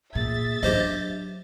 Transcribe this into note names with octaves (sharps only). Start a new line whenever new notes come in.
A#2 G#4 E5 A6
F#3 D4 F4 G4 C5 D#5